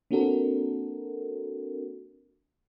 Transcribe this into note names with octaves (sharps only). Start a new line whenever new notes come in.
A#3 C4 D4 F#4 A4 A#4